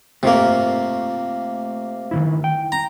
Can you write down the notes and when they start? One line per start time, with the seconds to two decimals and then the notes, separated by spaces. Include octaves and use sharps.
0.23 C3 A3 A#3 F4 A#4
2.11 D#3 E3 E4
2.44 G5
2.72 A#5